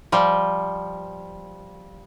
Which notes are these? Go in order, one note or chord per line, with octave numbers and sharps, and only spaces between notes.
F3 G3